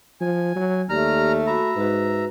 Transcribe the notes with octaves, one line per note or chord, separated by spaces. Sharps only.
F3 G#5
F#3
D#2 A3 G4 D5 A#5 F6
F#4 E5 A#5 B5
G#2 F#4 B4